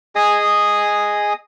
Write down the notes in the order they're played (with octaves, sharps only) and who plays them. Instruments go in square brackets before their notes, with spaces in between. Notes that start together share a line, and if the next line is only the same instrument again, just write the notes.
[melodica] G#4 D#5 G#5 D#6